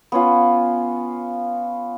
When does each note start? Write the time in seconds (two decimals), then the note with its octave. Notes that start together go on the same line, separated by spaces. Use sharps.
0.12 B3 C#4 F4